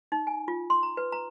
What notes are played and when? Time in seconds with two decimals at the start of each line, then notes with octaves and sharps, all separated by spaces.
0.12 D#4
0.27 G#5
0.48 F4
0.70 C6
0.83 A#5
0.97 B4
1.12 A#5